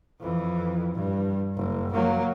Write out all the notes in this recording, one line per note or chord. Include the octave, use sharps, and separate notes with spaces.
F2 E3
G2
F#1
F#3 A#3